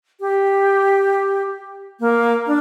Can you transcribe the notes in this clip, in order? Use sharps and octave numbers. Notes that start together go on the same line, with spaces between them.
G4
A#3
D4